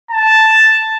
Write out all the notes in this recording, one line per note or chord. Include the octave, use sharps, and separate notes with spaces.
A5